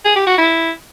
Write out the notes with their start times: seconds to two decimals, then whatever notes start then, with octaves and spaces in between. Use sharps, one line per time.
0.05 G#4
0.16 G4
0.27 F#4
0.38 E4